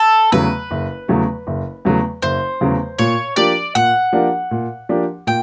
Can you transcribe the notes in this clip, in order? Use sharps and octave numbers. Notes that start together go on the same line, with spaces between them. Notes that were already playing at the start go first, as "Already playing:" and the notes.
Already playing: A4
E2 C#3 F#3 A3 B4
F#1
E2 C#3 F#3 A3
F#1
E2 C#3 F#3 A3
F#1 C5
E2 C#3 F#3 A3
A#2 C#5
F3 A#3 D4 G4 D5
A#2 F#5
F3 A#3 D4 G4
A#2
F3 A#3 D4 G4
A#2 G5